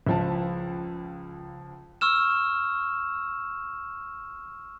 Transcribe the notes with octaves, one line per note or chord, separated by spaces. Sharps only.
C#2 F3 A5
C#6 E6 F6 E7